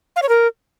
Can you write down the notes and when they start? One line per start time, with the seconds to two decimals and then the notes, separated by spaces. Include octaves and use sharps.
0.16 F5
0.22 C#5
0.29 A#4